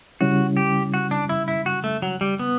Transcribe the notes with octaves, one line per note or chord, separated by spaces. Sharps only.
C#3 G3 C#4 E4 F#4
G4
F#4
D4
E4
E4
F#4
A3
F#3
G3
B3